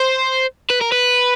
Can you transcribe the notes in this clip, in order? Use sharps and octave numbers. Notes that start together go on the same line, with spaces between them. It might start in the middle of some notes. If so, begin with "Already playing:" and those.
Already playing: C5
B4
A#4
B4